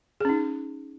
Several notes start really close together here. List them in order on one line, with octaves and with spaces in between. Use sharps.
G#4 C#4 D#4